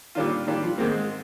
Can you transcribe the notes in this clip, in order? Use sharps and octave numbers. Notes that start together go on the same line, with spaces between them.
A#2 D#3 G3 D4 F4
A#2 D#3 G3 D4 F4
F3
G#2 D#3 G#3 A#3 C4
G#3